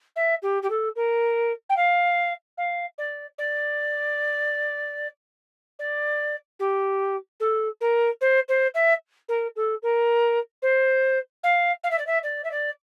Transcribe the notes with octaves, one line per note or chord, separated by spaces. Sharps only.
E5
G4
G4
A4
A#4
G5
F5
F5
D5
D5
D5
G4
A4
A#4
C5
C5
E5
A#4
A4
A#4
C5
F5
F5
E5
D5
E5
D5
E5
D5